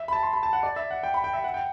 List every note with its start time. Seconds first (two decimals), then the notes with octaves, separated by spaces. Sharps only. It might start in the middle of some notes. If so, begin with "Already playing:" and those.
Already playing: E5
0.08 B5
0.13 A5
0.23 C6
0.33 B5
0.43 A5
0.53 F#5
0.63 D5
0.76 E5
0.91 F#5
1.03 G5
1.14 B5
1.24 G5
1.33 E5
1.44 F#5
1.54 G5